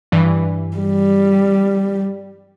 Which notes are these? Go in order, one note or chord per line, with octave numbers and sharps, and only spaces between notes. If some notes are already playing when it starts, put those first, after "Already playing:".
G2 E3
G3